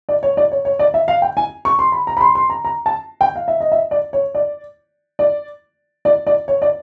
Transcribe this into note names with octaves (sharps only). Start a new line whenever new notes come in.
D5
C#5
D5
C#5
C#5
D5
E5
F5
G5
G#5
C#6
C6
B5
A#5
B5
C6
C6
A#5
A#5
A5
G5
F5
E5
D#5
E5
D5
C#5
D5
D5
D5
D5
C#5
D5